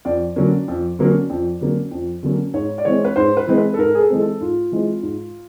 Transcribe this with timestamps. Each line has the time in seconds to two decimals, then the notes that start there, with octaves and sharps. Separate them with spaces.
0.05 F2 D5
0.36 D3 F#3 A#3 C#4
0.68 F2
0.99 D3 F#3 A#3 C#4
1.30 F2
1.61 D3 F#3 A#3 C#4
1.91 F2
2.23 D3 F#3 A#3 C#4
2.54 G#2 C#5
2.78 D5
2.85 E3 G#3 C4 C#5
3.05 B4
3.16 G#2 C5
3.37 B4
3.47 E3 G#3 C4
3.58 B4
3.74 A4
3.78 G#2 A#4
3.95 G#4
3.99 A4
4.10 E3 G#3 C4
4.20 A4
4.40 G#2 F4
4.72 E3 G#3 C4
5.03 G#2